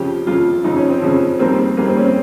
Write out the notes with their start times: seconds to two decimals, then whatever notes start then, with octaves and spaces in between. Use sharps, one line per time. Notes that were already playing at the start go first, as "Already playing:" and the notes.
Already playing: F2 C#3 F3 G4
0.27 F2 C#3 F3 F4
0.64 F2 C#3 F3 D#4
0.77 C#4
0.89 C4
1.02 F2 C#3 F3 C#4
1.39 F2 D#3 G3 A#3 C4
1.77 F2 D#3 G3 A#3
1.87 C4
1.96 C#4
2.06 C4